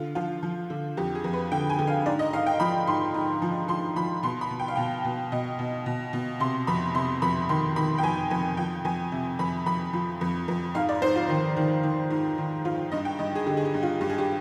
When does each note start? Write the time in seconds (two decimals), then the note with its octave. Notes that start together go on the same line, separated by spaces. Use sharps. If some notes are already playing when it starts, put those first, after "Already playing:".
Already playing: D3 F4
0.15 F3 F4
0.43 F3
0.70 D3
0.97 F2 G4
1.15 G#4
1.24 F2
1.33 B4
1.52 D3 G5
1.70 G#5
1.79 D3
1.87 F5
2.06 G#2 D5
2.19 D#5
2.33 G#2 F5
2.46 G5
2.60 F3 B5
2.87 G#2 C6
3.14 G#2
3.42 F3
3.68 F3 C6
3.96 F3 B5
4.23 B2 C6
4.41 B5
4.50 B2
4.60 G5
4.68 F5
4.75 B2 G5
5.05 B2
5.32 B2 D#5
5.59 B2
5.86 B2
6.13 B2
6.40 C3 C6
6.67 F2 B5
6.94 C3 C6
7.22 F2 B5
7.49 D#3 C6
7.76 D#3 B5
7.98 G5
8.03 F2 G#5
8.31 F2 G#5
8.57 F3 G5
8.85 F2 G#5
9.12 C3
9.39 F2 B5
9.66 F2 B5
9.93 F3
10.21 F2
10.48 F2
10.74 G#2 F5
10.89 D5
11.02 G#2 C5
11.16 F4
11.29 D#3
11.57 D#3
11.83 D#3
12.10 G#2
12.38 D#3
12.65 G#2 F4
12.92 G2 D#5
13.05 G5
13.19 G2 D#5
13.35 G#4
13.47 D3 G4
13.57 G#4
13.65 G4
13.74 G2
13.83 F4
14.01 G2 G4
14.09 G#4
14.18 G4